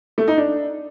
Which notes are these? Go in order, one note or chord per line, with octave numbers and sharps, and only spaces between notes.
A3
D#4
D4